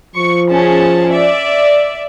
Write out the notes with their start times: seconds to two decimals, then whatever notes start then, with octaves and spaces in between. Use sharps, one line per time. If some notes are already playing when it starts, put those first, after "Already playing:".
0.15 F3 C#6
0.48 C#4 G#4 A5
1.10 D5 E5